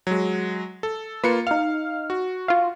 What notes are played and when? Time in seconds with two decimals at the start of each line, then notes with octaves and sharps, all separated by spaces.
0.07 F#3 G#3
0.83 A4
1.24 A#3 F4 B4 C#7
1.47 D#4 F5 F6
2.10 F#4
2.48 F4 F5